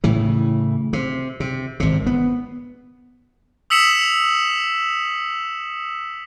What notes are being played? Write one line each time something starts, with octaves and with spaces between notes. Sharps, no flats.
A2 C#3 E3
C3
C3
G#1 C3
B3
D#6 E6 B6 C#7 E7 F#7